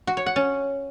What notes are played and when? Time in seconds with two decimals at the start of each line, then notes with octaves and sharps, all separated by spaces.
0.07 F#4
0.17 C#5
0.26 F#5
0.36 C#4